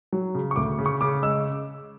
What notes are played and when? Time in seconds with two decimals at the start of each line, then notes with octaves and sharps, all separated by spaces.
0.13 F#3
0.35 C#3
0.51 C#6
0.56 D2 D6
0.79 C#3
0.86 C#6
1.01 C#3 D6
1.23 G#3 E6